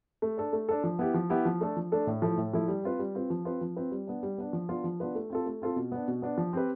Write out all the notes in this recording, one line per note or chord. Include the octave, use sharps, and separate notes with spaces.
A3
D4 A4
A3
D4 A4
F3
B3 E4 G4
F3
B3 E4 G4
F3
A3 D4 A4
F3
A3 D4 A4
A2
F3 A3 E4
A2
F3 A3 E4
G3
C4 F4 B4
G3
C4 F4 B4
F3
C4 F4 B4
F3
C4 F4 B4
G3
B3 D4
G3
B3 D4
F3
B3 D4 F4 B4
F3
B3 D4 F4 B4
A3
C4 F4 A4
A3
C4 F4 A4
B2
B3 D4
B2
B3 D4
F3
C4 G4 B4